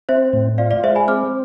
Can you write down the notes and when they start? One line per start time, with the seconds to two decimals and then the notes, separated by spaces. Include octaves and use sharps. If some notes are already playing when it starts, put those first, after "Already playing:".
0.09 C4 C5 E5
0.33 A2
0.58 F4 D5 F5
0.70 D5 F5
0.84 G#3 C5 E5
0.95 G#5 B5
1.08 C4 D6 F6